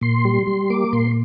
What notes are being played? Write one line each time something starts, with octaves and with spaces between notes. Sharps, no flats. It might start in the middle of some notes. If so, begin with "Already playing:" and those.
A#2 C6
G3
G3
A#3 D6
A#2 C6